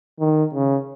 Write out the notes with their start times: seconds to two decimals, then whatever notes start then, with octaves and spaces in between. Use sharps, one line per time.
0.20 D#3
0.54 C#3